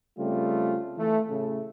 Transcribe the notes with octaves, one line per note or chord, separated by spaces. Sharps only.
C#3 G3 A3 C4 F4
E3 A3
A2 C#3 A3